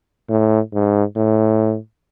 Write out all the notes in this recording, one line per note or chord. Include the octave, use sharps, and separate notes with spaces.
A2
G#2
A2